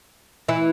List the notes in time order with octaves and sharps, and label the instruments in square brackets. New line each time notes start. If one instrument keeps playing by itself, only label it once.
[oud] E3 E4